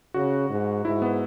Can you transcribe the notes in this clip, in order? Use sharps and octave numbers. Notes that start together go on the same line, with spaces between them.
C#3 F#4
G#2
G#2 E4
B3